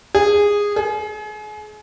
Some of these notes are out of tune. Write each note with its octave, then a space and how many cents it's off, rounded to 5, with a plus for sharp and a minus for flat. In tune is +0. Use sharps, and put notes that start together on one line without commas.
G#4 -15
G#4 +35